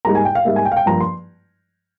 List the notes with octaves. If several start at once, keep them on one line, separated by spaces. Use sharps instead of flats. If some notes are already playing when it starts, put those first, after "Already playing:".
G#2 G3 A#3 A#5
G#5
G5
F5
G#2 G3 A#3 E5
G#5
G5
F5
G5
G2 F3 A#3 A#5
C6